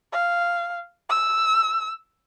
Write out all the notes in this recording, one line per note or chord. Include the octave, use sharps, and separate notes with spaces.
F5
E6